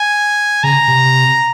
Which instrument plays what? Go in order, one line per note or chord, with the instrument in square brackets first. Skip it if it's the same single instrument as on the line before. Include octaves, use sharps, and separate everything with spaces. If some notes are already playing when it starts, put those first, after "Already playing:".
Already playing: [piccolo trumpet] G#5
[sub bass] C#3 [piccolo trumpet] A#5
[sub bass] C3